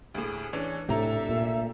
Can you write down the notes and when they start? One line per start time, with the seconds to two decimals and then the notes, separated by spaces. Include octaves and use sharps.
0.14 D2 A2 G#4
0.53 E3 C#4 D4
0.89 A2 C3 D4 G4 A4 E5 A#5
1.29 A#2